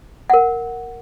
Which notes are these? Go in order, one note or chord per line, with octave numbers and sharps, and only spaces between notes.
A#4 F#5